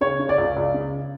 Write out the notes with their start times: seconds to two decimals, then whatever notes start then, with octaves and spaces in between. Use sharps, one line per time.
0.01 C#3 C#5
0.19 C#3
0.29 D5
0.38 C#2
0.56 C#2
0.74 C#3